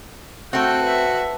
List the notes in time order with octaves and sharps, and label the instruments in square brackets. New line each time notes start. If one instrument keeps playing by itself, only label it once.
[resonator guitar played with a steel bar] A3 C4 [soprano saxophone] F#4 [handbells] F#5 A5 [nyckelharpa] G5
[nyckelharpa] B4 E5